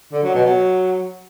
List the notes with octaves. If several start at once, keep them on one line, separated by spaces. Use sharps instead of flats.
D3
F#3
B2
F#3